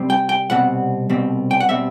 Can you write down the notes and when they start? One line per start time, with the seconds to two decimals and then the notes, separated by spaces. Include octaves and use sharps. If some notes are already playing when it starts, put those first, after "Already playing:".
Already playing: C2 G3 C4
0.10 G5
0.29 G5
0.50 C2 B2 G3 C4 F#5
1.10 C2 B2 G3 C4
1.51 G5
1.60 F#5
1.69 B2 G3 C4 E5